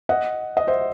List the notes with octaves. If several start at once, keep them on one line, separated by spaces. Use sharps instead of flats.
D#5 F#5
D#5
C5 E5